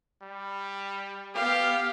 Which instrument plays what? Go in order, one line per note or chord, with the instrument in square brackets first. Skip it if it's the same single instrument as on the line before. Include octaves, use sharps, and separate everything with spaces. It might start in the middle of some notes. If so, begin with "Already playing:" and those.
[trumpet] G3
[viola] B3 F5 [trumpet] G4